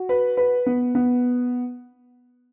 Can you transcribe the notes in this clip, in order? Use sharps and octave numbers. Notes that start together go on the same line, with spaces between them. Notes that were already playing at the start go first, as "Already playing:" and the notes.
Already playing: F#4
B4
B4
B3
B3